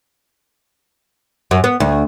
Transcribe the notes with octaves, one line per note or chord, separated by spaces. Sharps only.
F#2
B3
D2